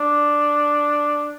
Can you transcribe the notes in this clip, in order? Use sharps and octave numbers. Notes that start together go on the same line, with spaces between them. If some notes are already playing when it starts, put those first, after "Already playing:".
Already playing: D4